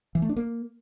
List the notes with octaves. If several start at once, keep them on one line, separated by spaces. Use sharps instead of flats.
E3
A3
D4
A#3